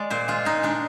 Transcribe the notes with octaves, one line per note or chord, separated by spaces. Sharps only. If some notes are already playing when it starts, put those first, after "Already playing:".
Already playing: G#3 D5
A#2 C5
G#3 F4
A#2 D#4
G#3 D4